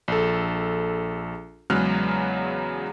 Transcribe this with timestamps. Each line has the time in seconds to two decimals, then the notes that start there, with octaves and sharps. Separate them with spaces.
0.08 A#1 A4
1.70 E2 C#3 F#3 G#3 F6 F#6